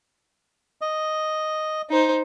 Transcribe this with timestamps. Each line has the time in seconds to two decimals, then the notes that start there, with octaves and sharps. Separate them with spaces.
0.81 D#5
1.90 D#4 C5